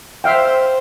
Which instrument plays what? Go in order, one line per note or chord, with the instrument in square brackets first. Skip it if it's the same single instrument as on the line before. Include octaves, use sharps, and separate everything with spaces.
[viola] C5 [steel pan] E5 F5 G5